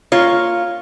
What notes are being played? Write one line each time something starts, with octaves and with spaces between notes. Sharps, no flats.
A#3 F4 C#5